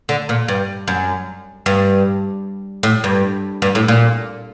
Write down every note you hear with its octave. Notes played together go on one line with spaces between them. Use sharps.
D3
A#2
G2
F#2
G2
A2
G2
G2
A2
A#2